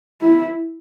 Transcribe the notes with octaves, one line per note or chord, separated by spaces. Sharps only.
E4